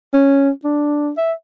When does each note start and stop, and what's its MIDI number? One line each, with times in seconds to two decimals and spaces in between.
0.13 0.50 61
0.64 1.10 62
1.17 1.33 76